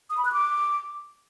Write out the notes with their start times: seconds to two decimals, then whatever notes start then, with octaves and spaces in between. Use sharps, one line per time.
0.10 D#6
0.17 B5
0.25 F#6
0.32 D6